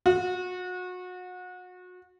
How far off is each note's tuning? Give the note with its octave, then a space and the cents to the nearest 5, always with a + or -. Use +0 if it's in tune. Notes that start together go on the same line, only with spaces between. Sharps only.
F#4 -30